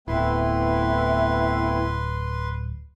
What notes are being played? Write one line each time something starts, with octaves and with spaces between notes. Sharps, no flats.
D1 A3 B3 C4 E4 B4 C6